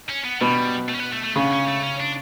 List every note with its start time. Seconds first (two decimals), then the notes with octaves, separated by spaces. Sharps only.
0.10 C#4
0.25 B3
0.41 B2 G3
0.89 A3
0.95 C#4
1.00 B3
1.13 A3
1.24 A3
1.36 C#3 B3
1.52 C#4
1.67 A3
1.83 C#4
2.00 D4